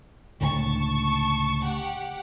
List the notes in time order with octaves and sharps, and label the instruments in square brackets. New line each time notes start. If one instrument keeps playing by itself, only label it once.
[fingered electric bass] C#2 A2 D3 [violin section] A5 C#6
[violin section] G4 F#5